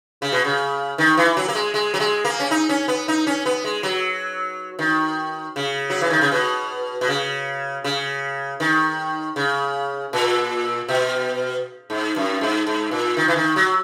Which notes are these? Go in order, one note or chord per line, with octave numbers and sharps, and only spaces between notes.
C#3
B2
C#3
D#3
E3
F#3
A#3
G#3
G#3
F#3
G#3
A#3
C#4
D#4
C#4
B3
D#4
C#4
B3
G#3
F#3
D#3
C#3
F#3
E3
D#3
C#3
B2
B2
C#3
C#3
D#3
C#3
A#2
B2
G#2
F#2
G#2
G#2
A#2
D#3
E3
D#3
F#3